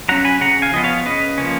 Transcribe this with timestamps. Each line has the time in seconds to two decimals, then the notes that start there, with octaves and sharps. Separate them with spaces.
0.09 F#3 C#4 F#5 A#5
0.25 G#5 B5
0.41 C#3 F#5 A#5
0.62 F5 G#5
0.73 F3 B3 D#5
0.84 C#5 F5
1.05 C#3 B4 D#5
1.38 F3 A#3 C#4